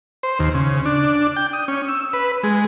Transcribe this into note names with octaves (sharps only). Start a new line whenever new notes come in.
C5
D#2
C#3
D4
G5
D#6
C#4
E6
B4
G#3